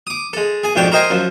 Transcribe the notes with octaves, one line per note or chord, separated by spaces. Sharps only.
D6 D#6
G#3 A4
G#4 G#5
F2 G#2 B2 D4 G5 D6
A#4 C5 D#5 G5 G#5 C6
F#2 F3